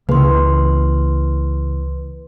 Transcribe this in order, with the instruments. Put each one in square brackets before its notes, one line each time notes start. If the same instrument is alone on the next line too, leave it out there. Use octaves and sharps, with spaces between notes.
[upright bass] C#2 [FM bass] C#3 [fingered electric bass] E3 A#3 [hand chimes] B4 C6